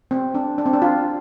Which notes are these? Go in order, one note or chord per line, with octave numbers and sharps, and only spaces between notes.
C4
D4
D4
C4
D4
F4